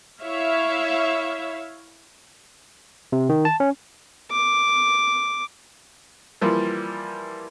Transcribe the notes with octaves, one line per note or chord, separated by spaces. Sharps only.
E4 C#5 E5 F5
C3
D#3
A5
C#4
D6
E3 F3 G3 A#3